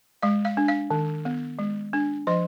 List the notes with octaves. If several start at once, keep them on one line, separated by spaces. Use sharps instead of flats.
G#3 F5
F5
D4
F5
D#3
B3
G#3
D4
F3 D#5